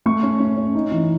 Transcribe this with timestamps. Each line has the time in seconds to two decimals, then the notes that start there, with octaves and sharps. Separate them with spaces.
0.06 A3 C#6
0.23 C#4
0.39 C#4
0.57 C#4
0.75 D#4
0.92 E3